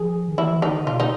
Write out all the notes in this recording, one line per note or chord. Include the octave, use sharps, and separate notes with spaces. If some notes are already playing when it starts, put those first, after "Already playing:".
Already playing: F3 G#4
D#3
E3 E4
E3
D#3 D#4
D3
B2 F4
D#4